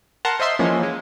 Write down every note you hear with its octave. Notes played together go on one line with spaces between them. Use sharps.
A#4 F#5 A5 A#5 C6
C5 D#5 E5 C6
E3 F3 G#3 A#3 C#4
G#3